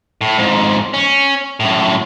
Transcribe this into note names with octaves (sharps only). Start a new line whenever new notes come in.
A2
F2 G#2
C#4
F#2 A2